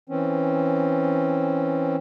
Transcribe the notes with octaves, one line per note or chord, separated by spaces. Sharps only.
E3 C4 C#4